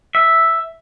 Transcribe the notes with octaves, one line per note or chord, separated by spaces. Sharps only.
E5